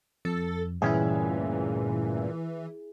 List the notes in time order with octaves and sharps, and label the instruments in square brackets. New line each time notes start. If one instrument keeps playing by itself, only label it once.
[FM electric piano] F2 [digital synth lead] A4
[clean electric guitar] D2 G2 C#4 [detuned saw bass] A#2 [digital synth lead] E3 [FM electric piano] E4 G#4